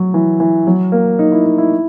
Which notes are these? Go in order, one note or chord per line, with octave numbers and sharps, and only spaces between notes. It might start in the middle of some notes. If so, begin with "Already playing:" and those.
Already playing: F#3
E3
E3
F#3
A#3
D#4
E4
D#4
E4